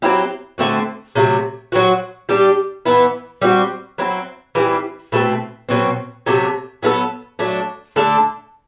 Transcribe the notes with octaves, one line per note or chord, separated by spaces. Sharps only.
F#3 C4 E4 G4
D3 A3 C4 F#4
C3 F#3 A3
F#3 C4 F#4
G3 D4 G4
E3 B3 E4
G3 C4 F#4
F#3 C4 E4
E3 G3 C4 E4
B2 A3 C4 E4
B2 F#3 C4
C3 F#3 A3
F#3 B3 F#4 A4
F#3 A3 D4
D3 A3 D4 A4